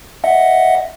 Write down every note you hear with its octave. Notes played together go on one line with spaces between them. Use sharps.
D#5 E5 F#5